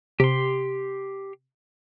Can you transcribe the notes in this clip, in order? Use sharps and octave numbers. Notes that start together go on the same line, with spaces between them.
C3 G4 C6